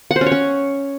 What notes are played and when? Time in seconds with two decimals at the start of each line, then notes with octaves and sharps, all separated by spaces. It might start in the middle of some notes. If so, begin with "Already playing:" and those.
0.11 F#5
0.16 C5
0.21 C#4
0.26 C#5
0.32 C#4